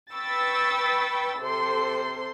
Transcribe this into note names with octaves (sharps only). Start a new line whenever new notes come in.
B4 G5 B5 C#6 E6 A6
C3 A4 C5 C6